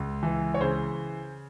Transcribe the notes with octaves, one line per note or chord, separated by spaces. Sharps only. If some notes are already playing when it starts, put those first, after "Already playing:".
Already playing: C#2
E3
C#5
C#3 C5